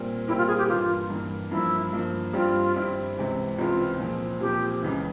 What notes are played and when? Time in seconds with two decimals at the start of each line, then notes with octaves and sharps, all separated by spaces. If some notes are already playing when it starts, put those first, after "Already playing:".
Already playing: A#2 G3 C4 G4 A#4
0.28 A#2 G3 C4 E4 G4 A#4
0.38 F4
0.48 G#4
0.58 G4
0.68 G2 E3 A#3 F4
1.10 G2 E3 A#3
1.51 G2 F3 A#3 E4
1.93 G2 F3 A#3
2.33 G2 G3 C4 E4 F4 G4
2.76 G2 G3 C4 E4 G4
3.17 C#2 C3 E3 G#3 C4
3.58 C#2 C3 E3 G#3 C4 F4
3.99 A#2 F3 C4
4.40 A#2 F3 C4 G4
4.83 C#2 C#3 E3